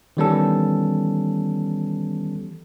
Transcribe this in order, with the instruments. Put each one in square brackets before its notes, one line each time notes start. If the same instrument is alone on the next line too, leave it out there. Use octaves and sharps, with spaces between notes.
[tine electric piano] D#3 E3 G3 B3 C#4 A4